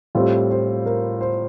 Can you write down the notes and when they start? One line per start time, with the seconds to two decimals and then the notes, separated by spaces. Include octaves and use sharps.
0.15 A2 G3 C4 F4
0.50 C5
0.86 A#4
1.21 C5